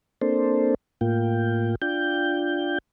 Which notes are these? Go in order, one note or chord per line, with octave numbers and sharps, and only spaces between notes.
A#3 C4 D4 A4 C5
A2 A#3 F4 G5
D4 F4 G5 G6